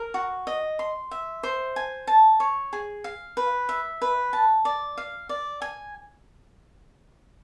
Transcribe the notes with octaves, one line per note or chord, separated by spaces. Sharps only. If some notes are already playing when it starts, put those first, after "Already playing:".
Already playing: A#4
F#4
D#5
C6
E5
C5
G#5
A5
C#5
G#4
F5
B4
E5
B4
A5
D5
F5
D5
G#5